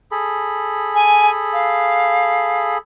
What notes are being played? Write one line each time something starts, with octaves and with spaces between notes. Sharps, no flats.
G#4 A4 B5
G#5
F5